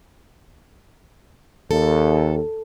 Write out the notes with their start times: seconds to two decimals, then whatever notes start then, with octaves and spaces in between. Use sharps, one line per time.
1.71 D#2 A4